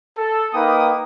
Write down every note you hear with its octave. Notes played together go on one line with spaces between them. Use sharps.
A4
A#3 D#4 B4 G5 D#6